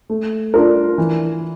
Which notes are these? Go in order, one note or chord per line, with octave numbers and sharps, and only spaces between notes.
A3
D4 F4 A#4
E3